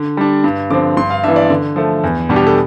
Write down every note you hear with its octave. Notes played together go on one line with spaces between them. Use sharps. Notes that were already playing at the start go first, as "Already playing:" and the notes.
Already playing: D3
G3 D4
G2
D3 F3 C4 D6
G2 C6
F5
E3 B3 D4 E5
D5
D3
F3 A3
E2
B2 G3 B3 D4
G4
A4